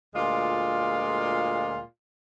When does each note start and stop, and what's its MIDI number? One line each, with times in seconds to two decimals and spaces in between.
0.15 1.80 38
0.15 1.80 46
0.15 1.80 56
0.15 1.80 65
0.15 1.80 74
0.15 1.80 77